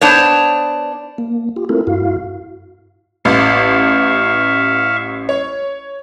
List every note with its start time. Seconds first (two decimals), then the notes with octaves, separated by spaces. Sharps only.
0.01 B3 D4 C5 C#5
1.18 A#3
1.56 F4 G4
1.69 A3 C4 E4 F4 A4 A#4
1.87 G2 E4 F#4 F5
3.25 A1 E5 F5 C#6
5.29 C#5